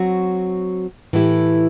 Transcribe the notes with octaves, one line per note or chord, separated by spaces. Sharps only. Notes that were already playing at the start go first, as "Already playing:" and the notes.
Already playing: F#3 C4 F#4
A2 E3 A3 E4 G4